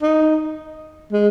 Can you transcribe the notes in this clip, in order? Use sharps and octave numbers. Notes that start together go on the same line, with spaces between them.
D#4
G#3